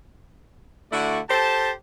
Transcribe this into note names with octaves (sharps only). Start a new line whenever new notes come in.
D3 A3 E4 F#4 D5
G4 A4 C5 A5